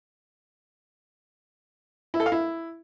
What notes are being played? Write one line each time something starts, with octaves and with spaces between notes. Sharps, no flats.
E4
A4
F5
E4